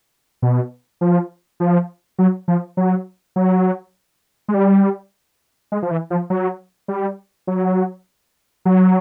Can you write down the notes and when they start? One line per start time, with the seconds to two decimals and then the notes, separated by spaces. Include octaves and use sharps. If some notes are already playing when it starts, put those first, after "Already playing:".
0.42 B2
1.01 F3
1.60 F3
2.18 F#3
2.48 F3
2.77 F#3
3.36 F#3
4.48 G#3
4.54 G3
5.72 G#3
5.82 F3
5.91 E3
6.10 F3
6.30 F#3
6.88 G3
7.47 F#3
8.65 F#3